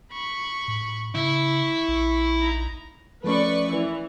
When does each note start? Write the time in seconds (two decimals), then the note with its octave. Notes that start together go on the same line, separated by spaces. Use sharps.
0.12 B5 C#6
0.68 A2
1.15 C#3 E4 C#6
1.88 A#1
2.39 D#4 A#5
3.24 F3 A3 C#4 B4 D5 C#6
3.72 E3